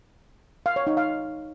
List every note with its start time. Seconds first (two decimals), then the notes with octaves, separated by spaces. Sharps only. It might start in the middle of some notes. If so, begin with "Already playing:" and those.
0.66 F5
0.76 C#5
0.87 D#4
0.97 F5